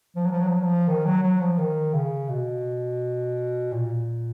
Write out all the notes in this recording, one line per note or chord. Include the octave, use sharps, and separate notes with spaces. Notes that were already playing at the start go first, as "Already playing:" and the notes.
F3
F#3
F3
F#3
F3
F#3
F3
D#3
F#3
F#3
F3
D#3
C#3
B2
A#2